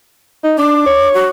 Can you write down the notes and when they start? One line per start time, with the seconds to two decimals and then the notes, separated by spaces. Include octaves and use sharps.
0.44 D#4
0.58 D4 D6
0.86 C#5
1.14 F#4